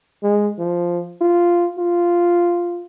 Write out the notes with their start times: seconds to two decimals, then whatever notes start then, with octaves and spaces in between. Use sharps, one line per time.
0.23 G#3
0.59 F3
1.21 F4
1.79 F4